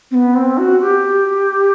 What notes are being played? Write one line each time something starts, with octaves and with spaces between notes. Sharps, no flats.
C4
B3
C4
F#4
G4